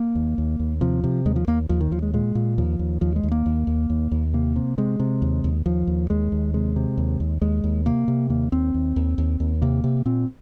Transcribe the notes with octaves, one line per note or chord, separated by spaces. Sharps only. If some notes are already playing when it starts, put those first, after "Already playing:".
Already playing: A#3
D#2
D#2
D#2
C3 F3
C3
D#2 G#3
F3
D#2 A#3
D#2 F3
D#3
D#2 F3
G#3
A#2 G#3
A#2
D#2 F3
D#2
D#2 F3
G#3
D#2
A#3
D#2
D#2
D#2
D#2
C3 A#3
C3
C3 G#3
C3
D#2
D#2
D#2 F3
D#2
D#2 G#3
D#2
C3 G#3
C3
D#2
D#2
D#2 G#3
D#2
C3 A#3
C3
D#2 A#3
D#2 C4
D#2
D#2
D#2
D#2
C3 A#3
C3
A#2 C4